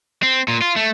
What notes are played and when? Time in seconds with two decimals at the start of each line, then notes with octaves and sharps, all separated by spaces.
0.23 C4
0.48 A#2
0.62 F4
0.76 A3